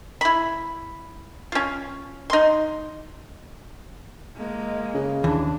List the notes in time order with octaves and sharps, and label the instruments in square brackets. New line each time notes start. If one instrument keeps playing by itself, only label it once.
[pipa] E4 B5
C#4 F4
D#4 C6
[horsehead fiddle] G#3 A#3
[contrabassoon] C#3
[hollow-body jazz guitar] D#2 E3 [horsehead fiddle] D4